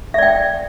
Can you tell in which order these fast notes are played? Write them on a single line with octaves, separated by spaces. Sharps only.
E5 D5 G5